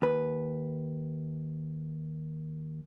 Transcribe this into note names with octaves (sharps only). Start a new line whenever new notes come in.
D#2 B4